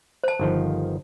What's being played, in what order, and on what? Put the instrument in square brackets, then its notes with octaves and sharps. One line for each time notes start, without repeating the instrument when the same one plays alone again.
[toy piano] C5 A5
[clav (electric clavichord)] G1 D#3 F3